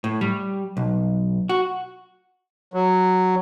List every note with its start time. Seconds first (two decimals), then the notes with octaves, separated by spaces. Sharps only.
0.04 A2
0.21 G3
0.77 B1
1.49 F#4
2.74 F#3